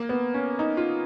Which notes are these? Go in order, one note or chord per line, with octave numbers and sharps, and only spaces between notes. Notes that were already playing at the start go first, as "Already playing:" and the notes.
Already playing: A#3
B3
C#4
D#4
F4